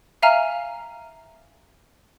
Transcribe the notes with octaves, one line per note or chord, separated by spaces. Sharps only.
E5 F5 G#5 A#5 F6